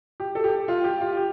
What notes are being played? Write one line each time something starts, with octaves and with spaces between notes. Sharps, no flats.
G4
A4
G4
F4
G4
F4
G4